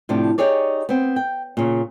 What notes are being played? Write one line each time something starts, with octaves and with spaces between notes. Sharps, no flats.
A2 C3 F3 D4
D#4 G4 G#4 C#5 D5
B3 C4
G5
A#2 C#3